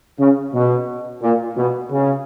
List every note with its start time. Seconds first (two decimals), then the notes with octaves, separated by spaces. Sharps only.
0.19 C#3
0.54 B2
1.23 A#2
1.57 B2
1.91 C#3